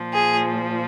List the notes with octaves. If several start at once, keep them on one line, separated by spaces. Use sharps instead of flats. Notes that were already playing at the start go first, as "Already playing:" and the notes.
Already playing: A#2 F3
G#4